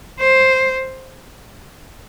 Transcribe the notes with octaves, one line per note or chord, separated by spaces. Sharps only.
C5